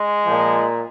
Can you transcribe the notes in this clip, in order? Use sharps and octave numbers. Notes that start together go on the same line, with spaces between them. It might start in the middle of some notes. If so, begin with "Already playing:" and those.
Already playing: G#3
A#2 F3